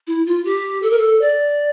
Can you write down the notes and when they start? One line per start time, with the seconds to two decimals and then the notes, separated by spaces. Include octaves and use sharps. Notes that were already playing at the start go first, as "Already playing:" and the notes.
0.07 E4
0.26 F4
0.45 G4
0.82 A4
0.90 A#4
0.98 A4
1.21 D5